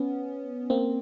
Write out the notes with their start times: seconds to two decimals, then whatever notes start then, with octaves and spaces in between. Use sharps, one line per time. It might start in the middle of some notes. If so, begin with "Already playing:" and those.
Already playing: B3 C#4
0.70 A#3 C4